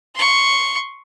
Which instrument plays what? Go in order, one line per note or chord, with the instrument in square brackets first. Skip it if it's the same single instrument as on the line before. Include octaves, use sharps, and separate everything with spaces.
[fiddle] C6 C#6